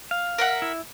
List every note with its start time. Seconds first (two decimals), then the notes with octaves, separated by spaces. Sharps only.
0.11 F5
0.38 A#4 E5 F#5
0.62 E4